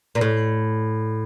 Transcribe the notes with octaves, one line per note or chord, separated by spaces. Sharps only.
A#2
A2